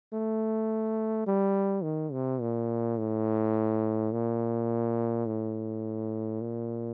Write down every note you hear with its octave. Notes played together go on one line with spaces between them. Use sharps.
A3
G3
D#3
C3
A#2
A2
A#2
A2
A#2